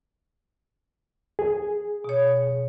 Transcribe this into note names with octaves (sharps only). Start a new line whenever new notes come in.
G#4
B2 C#5